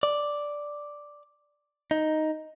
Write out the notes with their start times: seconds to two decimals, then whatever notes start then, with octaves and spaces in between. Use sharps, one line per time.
0.03 D5
1.91 D#4